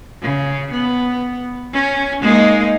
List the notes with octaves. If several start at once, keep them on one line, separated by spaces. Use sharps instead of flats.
C#3
B3
C#4
G#3 A#3 D#4